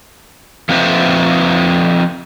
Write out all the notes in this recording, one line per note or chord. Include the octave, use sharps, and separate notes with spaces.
F3 C4 D#4 B4 C5 E5